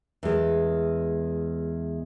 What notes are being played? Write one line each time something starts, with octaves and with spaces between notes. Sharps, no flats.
E2 G#3